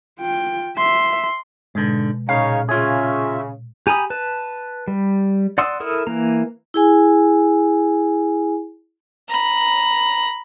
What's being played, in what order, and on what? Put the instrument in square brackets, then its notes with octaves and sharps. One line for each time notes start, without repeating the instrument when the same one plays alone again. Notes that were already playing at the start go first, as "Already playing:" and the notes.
[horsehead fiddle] F4 G5
[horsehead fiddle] E5 [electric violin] C6
[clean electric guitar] G#2 D3 [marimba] B2 G#3
[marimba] A#2 B5 [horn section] C#3 [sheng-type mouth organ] D#4 C#5 [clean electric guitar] F5
[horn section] C#3 [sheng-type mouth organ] C#4 E5 [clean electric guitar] F4 G#4
[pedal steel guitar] G4 G#5 A#5 B5 D#6
B4 A5
G3
D5 F#5 C6 D#6 E6
E4 A4 A#4 D#6
E3 A#3 A#5
[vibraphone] E4 G#4 G#5
[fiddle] A#5 B5